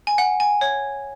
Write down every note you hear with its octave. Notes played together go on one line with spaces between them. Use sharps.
G#5
F#5
G#5
C#5